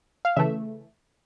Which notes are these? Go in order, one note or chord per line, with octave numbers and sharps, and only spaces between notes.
F5
C#3 E3 A3 E5